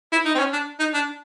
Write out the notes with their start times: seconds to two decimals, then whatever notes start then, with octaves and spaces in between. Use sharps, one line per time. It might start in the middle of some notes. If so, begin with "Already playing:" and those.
0.12 E4
0.25 D#4
0.35 C4
0.39 C#4
0.53 D4
0.80 D#4
0.94 D4